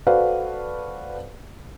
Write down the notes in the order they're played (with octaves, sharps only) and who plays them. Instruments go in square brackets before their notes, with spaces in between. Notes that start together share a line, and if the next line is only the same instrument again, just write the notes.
[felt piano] F#4 A4 B4 C5 D5 F5